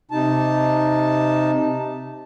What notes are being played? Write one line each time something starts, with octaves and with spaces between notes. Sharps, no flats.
C3 D#4 A5